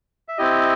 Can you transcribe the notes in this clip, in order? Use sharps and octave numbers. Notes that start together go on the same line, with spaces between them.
E5
C4 E4 G4 D#5